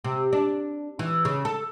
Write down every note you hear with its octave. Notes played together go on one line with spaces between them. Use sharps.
C3
D4
E3
C#3
A4